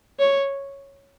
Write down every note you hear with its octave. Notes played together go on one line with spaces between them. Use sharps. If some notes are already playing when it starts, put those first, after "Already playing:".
C#5